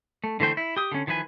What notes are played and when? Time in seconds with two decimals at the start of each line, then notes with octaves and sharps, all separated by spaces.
0.24 A3
0.40 D3 E3 A3 C5 G5
0.57 E4
0.77 G4 D#6
0.92 D3 C#4
1.07 D#3 F3 E4 B4 G#5